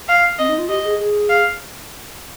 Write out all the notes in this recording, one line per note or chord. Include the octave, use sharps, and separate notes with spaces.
F5
C4 D#5
D#4
F4
G4 D#5
G#4
G#4
F5